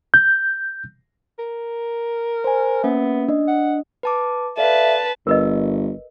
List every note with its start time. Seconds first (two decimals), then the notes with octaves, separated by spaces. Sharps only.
0.14 G6
1.39 A#4
2.44 C5 G#5
2.83 A#3 B3 C#4 E5
3.28 D4 D#5
3.48 F#5
4.03 B4 A5 D6
4.57 A4 B4 D5 E5 F5 A5
5.27 G1 A#4 B4 D#5